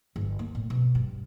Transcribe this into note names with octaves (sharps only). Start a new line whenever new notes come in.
G1
A#3
A2
B2
G2